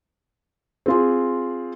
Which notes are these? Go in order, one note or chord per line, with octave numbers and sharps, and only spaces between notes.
C4 F4 G#4